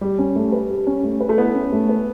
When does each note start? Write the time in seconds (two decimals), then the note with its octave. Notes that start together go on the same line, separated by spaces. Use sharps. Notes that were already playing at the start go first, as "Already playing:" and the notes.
0.01 G3 G4
0.19 C#4
0.36 A3
0.52 B4
0.70 G4
0.87 C#4
1.03 A3
1.20 B4
1.29 A3
1.38 B3 E4
1.55 C#4
1.72 A3
1.89 B4